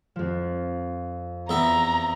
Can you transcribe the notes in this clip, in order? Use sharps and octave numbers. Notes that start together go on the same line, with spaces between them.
F2 F3
E2 B3 E5 A#5